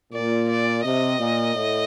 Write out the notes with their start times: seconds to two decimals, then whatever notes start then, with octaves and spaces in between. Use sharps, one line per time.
0.13 A#2 D5
0.49 D5
0.84 C3 D#5
1.19 A#2
1.55 A2